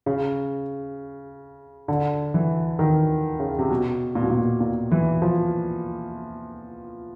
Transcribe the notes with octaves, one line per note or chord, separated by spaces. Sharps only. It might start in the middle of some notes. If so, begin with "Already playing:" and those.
C#3
D3
E3
D#3
C#3
C3
B2
A#2
B2
A#2
A#2
E3
F3